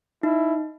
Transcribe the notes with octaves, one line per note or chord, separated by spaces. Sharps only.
D#4 E4